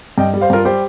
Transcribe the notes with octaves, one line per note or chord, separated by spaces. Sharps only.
G2 D#5 G5
G3
C5 F5
G2 F4 A#4
G3 G4 C5